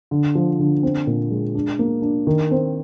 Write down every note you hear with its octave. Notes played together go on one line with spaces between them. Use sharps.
D3
F3
D3
C4
A#2
G#3
D4
A#3
D4
D#3
C4